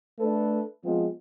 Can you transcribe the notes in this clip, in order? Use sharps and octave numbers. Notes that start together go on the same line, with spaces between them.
A3 D4 A4 B4
F3 G#3 B3 C4 F4